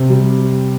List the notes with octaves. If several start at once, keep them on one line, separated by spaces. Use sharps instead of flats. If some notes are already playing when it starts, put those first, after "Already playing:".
Already playing: C3
G3